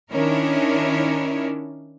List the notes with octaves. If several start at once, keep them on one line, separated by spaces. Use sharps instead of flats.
D#3 C#4 D4 E4 A#4 C#5